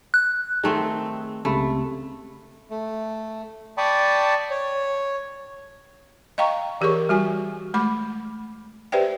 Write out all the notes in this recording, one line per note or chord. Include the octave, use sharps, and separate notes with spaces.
F#6
D#3 A3 C4 G#4
C#2 C3 A3 B5
A3
D5 G5 A5 B5 C#6 D#6
C#5
D#5 F5 G5 A#5 C#6
E3 G4 G#4 A#4 C#5 C#6
G3 F#4 G#5
G#3 A3 B5 D6
G4 B4 C5 D5 E5 G5